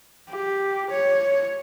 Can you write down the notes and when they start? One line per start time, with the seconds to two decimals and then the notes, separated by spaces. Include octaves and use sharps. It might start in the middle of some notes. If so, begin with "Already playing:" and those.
0.29 G4
0.91 C#5